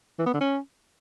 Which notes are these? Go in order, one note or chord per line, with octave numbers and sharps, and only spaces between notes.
E3
B3
D3
C#4